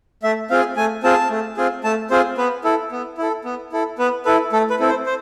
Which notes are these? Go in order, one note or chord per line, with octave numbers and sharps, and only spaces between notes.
A3 E5
C4 F4 G#4 F5
A3 G#5
C4 F4 G#4 A5
A3
C4 F4 G#4
A3 A5
C4 F4 G#4 C5
B3 B4
E4 A4
B3
E4 A4
B3
E4 A4
B3 B4
E4 A4 B4
A3 A4
B4
C4 E4 A4
C5
C5